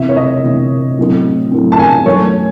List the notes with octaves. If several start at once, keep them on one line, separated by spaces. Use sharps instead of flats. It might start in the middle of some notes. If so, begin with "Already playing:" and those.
Already playing: C3 E3 C4 E5
C#5
D#5
C3 E3 C4
A2 F#3 A3 C4
A2 F#3 A3 C4
A5
G#5
F#2 D#3 A3 C#5